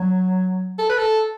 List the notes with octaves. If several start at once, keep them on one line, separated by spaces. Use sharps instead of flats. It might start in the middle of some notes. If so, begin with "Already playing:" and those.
Already playing: F#3
A4
B4
A4